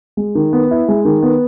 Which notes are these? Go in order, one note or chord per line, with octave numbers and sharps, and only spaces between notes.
G#3
D#3
B3
E4
G#3
D#3
B3